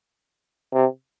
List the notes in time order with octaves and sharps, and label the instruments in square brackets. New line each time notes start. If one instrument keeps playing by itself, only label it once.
[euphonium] C3